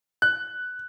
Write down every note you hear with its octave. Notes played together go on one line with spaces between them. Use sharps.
F#6